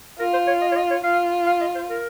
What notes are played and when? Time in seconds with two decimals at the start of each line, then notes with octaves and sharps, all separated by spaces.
0.19 F4 A#4
0.33 C5
0.47 C#5
0.62 D#5
0.72 C#5
0.76 D#5
0.91 C#5
1.04 F4 F5
1.47 F5
1.61 D#5
1.75 C5
1.90 A#4